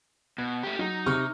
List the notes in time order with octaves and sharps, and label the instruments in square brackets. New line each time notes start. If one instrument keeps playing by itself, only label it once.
[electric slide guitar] B2 [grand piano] G#6
[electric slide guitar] A3 G4
[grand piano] F#3 [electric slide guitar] D#4
[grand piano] C3 C#6 F6